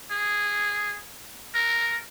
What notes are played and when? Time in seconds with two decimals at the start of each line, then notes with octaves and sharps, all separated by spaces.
0.11 G#4
1.54 A#4